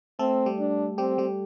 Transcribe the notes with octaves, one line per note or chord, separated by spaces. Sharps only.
A3 C4 A4
G3 G4
D4
G3 C4 G4
G3 G4